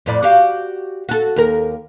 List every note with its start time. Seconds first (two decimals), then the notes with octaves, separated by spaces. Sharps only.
0.06 F2 A2 D5
0.22 F#4 G4 F5
1.09 F#4 A4
1.36 D#2 A#4